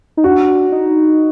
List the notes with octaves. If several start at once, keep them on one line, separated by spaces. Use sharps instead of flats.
D#4
D4 F#4
D#4